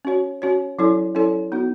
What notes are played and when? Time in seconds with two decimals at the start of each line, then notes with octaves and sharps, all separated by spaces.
0.05 C#4 F#4 C#5
0.42 C#4 F#4 C#5
0.78 F#3 C#4 E4 A4 C#5
1.15 F#3 C#4 E4 A4 C#5
1.52 B3 D#4 F#4